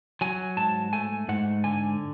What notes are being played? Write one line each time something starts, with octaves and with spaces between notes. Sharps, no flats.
F#3 G#5
G#2 A5
A3 G#5
G#2 F#5
D3 G#5